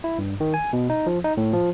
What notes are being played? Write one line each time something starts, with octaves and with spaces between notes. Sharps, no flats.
E4
G2
D#3
G#5
B2
D#4
F3
D#4
A2
F3